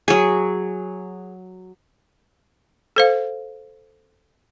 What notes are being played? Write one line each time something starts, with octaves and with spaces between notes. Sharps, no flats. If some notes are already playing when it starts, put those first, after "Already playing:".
F#3 G#4
A4 C5 F5